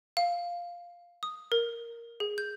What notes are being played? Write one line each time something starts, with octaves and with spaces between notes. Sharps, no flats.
F5
D#6
A#4
G#4
G6